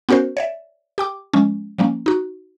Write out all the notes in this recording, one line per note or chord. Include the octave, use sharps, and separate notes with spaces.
B3 C#4 F#4 A#4 C5
C#5 D5 E5
G4 G5 D6
F3 G#3 C#4
F3 G3 A#3 C#4
D#4 F#4